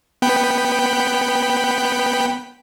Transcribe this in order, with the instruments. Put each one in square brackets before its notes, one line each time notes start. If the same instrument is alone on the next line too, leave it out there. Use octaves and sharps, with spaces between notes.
[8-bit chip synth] B3 G5 B5